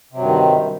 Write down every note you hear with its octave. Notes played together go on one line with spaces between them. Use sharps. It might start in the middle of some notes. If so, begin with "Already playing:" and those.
G2 C3 D#3 F#3